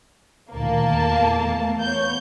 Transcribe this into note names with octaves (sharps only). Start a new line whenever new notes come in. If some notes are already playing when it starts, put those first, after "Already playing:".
D2 A#2 D#3 A#3 A5
E2 A3
B3 C#5 G6